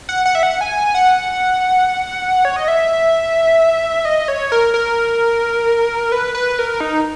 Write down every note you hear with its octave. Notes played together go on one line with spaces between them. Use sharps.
F#5
F#5
E5
F#5
G#5
F#5
C#5
D#5
E5
D#5
C#5
A#4
A#4
B4
B4
A#4
D#4